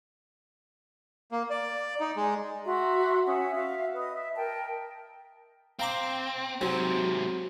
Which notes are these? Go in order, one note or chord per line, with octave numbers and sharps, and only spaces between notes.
A#3
D5
D#4
G#3
F#4 E5 A#5 C6
C#4 E5 F#5 D#6
F#4 E5 F5
B4 D#5 D#6
E5
A#4 G5 A5
C4 F5 A#5 D6
G#2 C3 F#3 C4